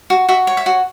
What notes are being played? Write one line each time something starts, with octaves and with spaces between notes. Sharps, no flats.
F#4
F#4 E5
C#5
E5
F#4